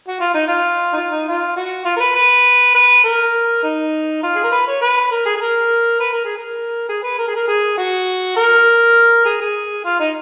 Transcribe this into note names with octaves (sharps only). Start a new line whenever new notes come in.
F#4
F4
D#4
F4
D#4
F4
D#4
F4
F#4
F4
A#4
B4
B4
B4
A#4
D#4
F4
G#4
A#4
B4
C#5
B4
A#4
G#4
G#4
A#4
B4
A#4
G#4
A#4
G#4
B4
A#4
G#4
A#4
G#4
F#4
A#4
G#4
G#4
F4
D#4